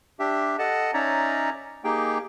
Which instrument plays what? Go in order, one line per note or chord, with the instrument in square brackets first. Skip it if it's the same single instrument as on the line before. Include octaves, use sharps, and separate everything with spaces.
[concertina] D4 G4 E5
A4 D#5 F#5 A5
C#4 D#4 C#5 D5 E5 A#5
A#3 D#4 G4 G#4 G5